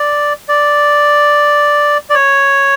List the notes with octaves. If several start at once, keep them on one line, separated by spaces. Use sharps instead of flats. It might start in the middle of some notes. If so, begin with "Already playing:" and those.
Already playing: D5
D5
D5
C#5